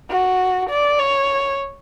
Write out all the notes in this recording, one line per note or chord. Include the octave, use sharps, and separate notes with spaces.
F#4
D5
C#5